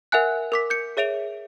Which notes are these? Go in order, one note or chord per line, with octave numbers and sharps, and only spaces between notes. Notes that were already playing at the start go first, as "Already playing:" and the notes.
A#4 E5 F#5 G#5 F#6
A#4 D6 B6
G6 C#7
G#4 C#5 E5 D7 F7